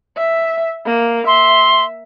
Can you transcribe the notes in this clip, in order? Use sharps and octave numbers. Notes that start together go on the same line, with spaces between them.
E5
A#3
E5 C6